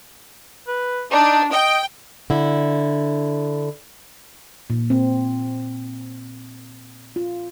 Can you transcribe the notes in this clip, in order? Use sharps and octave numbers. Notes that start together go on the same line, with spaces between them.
B4
D4 D#4
D#5 G5
D3 E4
A#2
C4
F4